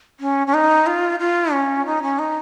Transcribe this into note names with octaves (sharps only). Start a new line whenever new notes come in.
C#4
C#4
D#4
F4
F4
C#4
D#4
C#4
D#4